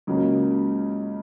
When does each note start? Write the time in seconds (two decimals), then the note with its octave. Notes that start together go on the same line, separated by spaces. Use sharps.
0.07 C#2 C#3 F#3 A#3